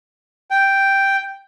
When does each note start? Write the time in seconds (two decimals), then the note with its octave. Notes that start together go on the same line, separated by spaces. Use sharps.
0.51 G5